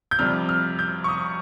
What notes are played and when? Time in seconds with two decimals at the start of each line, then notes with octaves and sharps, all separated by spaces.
0.11 G6
0.19 F2 C3 G3 F6
0.49 F6
0.79 G6
1.04 C#6
1.08 D#6